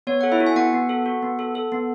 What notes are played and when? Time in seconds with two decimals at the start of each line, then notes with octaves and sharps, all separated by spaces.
0.07 B3 C#5
0.21 A4 F#5
0.32 E4 E5
0.40 F#4
0.46 G#5
0.56 B3 F#4 F#5
0.73 B3
0.89 A4
1.06 F#4
1.22 B3
1.39 A4
1.55 A4
1.72 B3